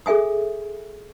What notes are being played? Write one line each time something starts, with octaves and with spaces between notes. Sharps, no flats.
G#4 A4 E5 G#5 D#6